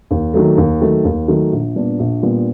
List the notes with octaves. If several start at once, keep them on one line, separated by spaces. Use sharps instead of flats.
D#2
D#3 F#3 A3
D#2
D#3 F#3 A3
D#2
D#3 F#3 A3
A#1
A#2 G3 B3 D4
A#1
A#2 G3 B3 D4